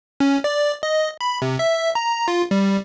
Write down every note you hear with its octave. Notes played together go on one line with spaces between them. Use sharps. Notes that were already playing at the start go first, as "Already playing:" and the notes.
C#4
D5
D#5
B5
C3
E5
A#5
F4
G3